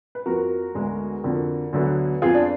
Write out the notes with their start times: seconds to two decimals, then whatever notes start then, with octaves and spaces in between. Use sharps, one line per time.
0.15 B4
0.26 F2 F3 A#3 F#4 A#4
0.75 D2 D3 G#3 B3
1.24 F2 D3 F3 A#3
1.73 D2 D3 F#3 B3
2.22 F2 F3 B3 F4 G#4
2.35 D4